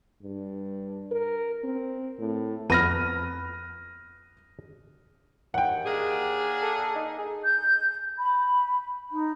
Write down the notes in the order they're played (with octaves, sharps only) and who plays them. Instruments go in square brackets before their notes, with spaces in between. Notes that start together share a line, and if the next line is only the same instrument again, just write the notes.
[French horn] G2
A#4
C4
A2
[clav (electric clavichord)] F2 B3 [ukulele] B5 [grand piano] F6 A#6 D#7
[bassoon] D#2 [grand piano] F#5 G5
[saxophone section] A#3 D4 G#4
[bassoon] A4
D#4
G#4
[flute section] G6
B5
D#4